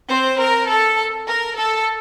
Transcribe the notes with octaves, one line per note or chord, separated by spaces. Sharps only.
C4 C5
A#4
A4
A#4
A4